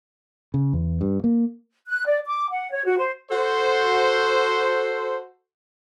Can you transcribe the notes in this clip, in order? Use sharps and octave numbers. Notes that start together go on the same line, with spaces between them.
C#3
E2
G2
A#3
F#6
D5
D6
F#5
C#5
F#4
C5
F#4 A4 C5